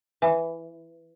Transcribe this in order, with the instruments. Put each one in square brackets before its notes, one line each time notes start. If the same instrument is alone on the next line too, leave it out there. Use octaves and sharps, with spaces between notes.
[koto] E3